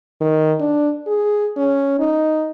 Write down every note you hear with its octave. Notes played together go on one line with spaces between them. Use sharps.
D#3
D4
G#4
C#4
D#4